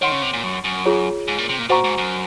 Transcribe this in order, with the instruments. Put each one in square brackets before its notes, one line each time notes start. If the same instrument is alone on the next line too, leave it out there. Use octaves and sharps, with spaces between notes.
[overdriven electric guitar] D#3 [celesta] C#5 F#5 C6
[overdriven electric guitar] C#3
C3
A#2
F#2
F#2
[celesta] F4 G#4 C#5
[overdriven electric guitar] G#2
A#2
C3
A#2
[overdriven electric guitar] A#2 [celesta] F#4 C5 F#5 A#5 C#6
[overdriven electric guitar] G#2
F#2